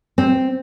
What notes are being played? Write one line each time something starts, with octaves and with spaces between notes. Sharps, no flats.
C4